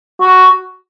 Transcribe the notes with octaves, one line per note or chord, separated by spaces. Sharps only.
F#4